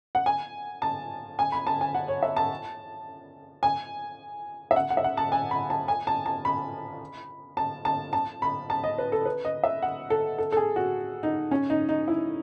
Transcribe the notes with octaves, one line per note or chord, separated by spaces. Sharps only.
F#5
G#5
A5
G#5
B5
A5
G#5
F#5
C#5
E5
A5
G#5
E5
F#5
F#5
E5
F#5
A5
G#5
B5
A5
G#5
A5
A5
B5
A5
A5
A5
B5
A5
D#5
B4
A4
B4
D#5
E5
F#5
A4
A4
A4
G#4
F#4
D#4
C#4
D#4
D#4
E4